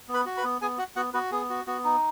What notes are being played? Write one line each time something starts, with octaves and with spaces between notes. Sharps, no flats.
B3
B4 B5
F#4
B4 B5
B3
B3 G#4 G#5
F#4 F#5
B3 F#4 F#5
B3 F#4 B4
B3 G#4
F#4
B3 F#4
D#4